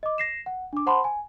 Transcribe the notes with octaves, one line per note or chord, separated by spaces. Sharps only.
D#5 D6
A#6 C7 E7
F#5
D4 D6
C5 F#5 A5 B5 C6
G#5